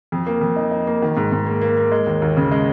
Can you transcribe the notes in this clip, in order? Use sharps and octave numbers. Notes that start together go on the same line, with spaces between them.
F2
A#3
F2
D#4
D#4
A#3
D#3
G#2
G#2
A#3
A#3
A#3
G#3
D#2
D#2
C#3
G#3